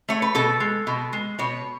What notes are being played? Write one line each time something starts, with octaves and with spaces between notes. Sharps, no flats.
A3 C#5
B4
B2 A4
G#3
B2
G#3
B2 C#5